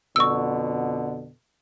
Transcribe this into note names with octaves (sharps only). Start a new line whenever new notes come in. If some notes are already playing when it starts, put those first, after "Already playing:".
F2 B2 D3 C#6 E6